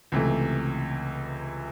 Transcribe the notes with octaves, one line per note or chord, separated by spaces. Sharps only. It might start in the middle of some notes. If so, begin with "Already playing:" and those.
C#2 C3 E3 A3